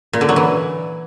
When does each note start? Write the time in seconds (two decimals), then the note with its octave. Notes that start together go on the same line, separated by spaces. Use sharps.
0.13 A#2
0.21 D3
0.29 F#3
0.36 E3